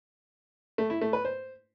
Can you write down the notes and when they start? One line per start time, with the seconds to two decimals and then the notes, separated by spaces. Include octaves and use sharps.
0.78 A3
0.90 E4
1.01 A3
1.13 B4
1.25 C5